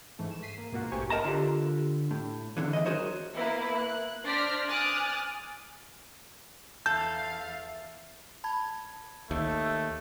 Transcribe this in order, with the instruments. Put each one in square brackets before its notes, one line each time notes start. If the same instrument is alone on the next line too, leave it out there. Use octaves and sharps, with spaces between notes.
[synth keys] G#2 E3 A3
E7
B6 C7 D#7
A#3
G#2 B2 A#3 F4 F#4
A#1 A3 G4 C5 G#5 C#6
[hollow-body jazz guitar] A#4 D#5 A5 A#5
D3 F4 G4
A2
E2 G2 D3 E3
E3 D#5
F#3 F#4 G#4 A#4 C5 C#5
[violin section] A#3 B3 E4 B4
F#6
D4 C5 D5 F6 A#6 B6
G#5 D6 D#6 F6 F#6 A6
[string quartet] E2 F5 A6 [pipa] A4 [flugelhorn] E5 [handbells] G6
[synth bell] A5 B5 G#6
[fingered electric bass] D#2 [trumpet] A3